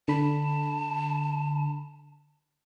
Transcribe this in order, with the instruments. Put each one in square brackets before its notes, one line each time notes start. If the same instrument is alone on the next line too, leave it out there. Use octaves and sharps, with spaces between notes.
[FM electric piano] D3 B5 [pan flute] A5